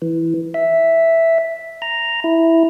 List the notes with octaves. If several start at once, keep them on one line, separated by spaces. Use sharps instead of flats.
E3
E5
A#5
E4